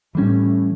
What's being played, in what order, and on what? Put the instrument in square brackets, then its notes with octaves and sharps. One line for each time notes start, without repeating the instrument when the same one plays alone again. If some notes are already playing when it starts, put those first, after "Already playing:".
[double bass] A2 [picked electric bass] E3 G3 C#4